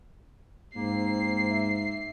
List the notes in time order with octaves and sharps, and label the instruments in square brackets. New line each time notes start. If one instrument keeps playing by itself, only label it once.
[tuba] G#2 [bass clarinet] A#3 [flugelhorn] C4 [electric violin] C7
[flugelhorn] E5